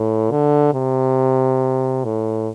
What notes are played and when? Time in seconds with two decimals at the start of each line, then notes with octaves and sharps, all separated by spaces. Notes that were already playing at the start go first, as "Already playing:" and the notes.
Already playing: A2
0.31 D3
0.73 C3
2.04 A2